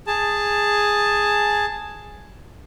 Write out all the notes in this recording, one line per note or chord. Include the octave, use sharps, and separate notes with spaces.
G#4 A5